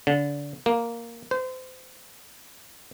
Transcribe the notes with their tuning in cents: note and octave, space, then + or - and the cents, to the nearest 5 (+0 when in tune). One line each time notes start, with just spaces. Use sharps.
D3 -30
A#3 +0
C5 -30